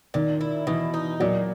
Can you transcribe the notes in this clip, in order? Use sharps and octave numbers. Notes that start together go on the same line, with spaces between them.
A#2 D#3
E4
B2 E3
D#4
A#2 F#3